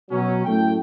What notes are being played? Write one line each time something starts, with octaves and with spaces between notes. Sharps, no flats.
B2 F#3 C#4
F#2 A2 A3 G5